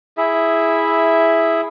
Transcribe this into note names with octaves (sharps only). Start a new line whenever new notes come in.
E4 G#4 E5